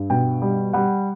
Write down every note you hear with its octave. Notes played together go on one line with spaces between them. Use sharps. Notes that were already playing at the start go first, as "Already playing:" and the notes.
Already playing: G2
B2 G5
G3
G3 F#5